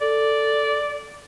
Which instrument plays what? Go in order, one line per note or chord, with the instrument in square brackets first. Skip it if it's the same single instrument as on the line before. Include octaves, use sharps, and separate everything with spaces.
[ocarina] A4 [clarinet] D5